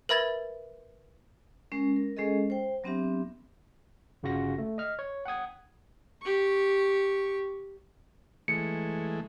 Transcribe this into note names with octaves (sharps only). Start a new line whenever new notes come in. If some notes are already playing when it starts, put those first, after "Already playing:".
A#4 B4 E5 B5 G#6 A6
G#3 C#4 A#4
A#4
G#3 C#4 G#4 A4 D#5
C5 G5
F#3 B3 C4 D4 G4 E5
G1 C#3 F4 F#4 A#6
A3
D#5 F6
C#5
F#5 G5 D#6 G#6
G4 C#6
E3 G#3 A3 C#7